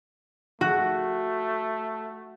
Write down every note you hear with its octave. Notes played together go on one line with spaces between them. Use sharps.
A3 F#4